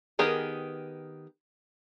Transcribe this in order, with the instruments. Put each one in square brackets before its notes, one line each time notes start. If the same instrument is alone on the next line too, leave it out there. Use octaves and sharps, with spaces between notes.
[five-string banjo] D#3 B3 G4 G#4 A#4